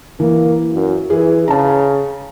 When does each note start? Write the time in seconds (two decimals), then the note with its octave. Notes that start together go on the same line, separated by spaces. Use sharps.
0.20 E3 A#3
0.74 F#2
1.10 E3 G#4
1.48 C#3 A5 A#5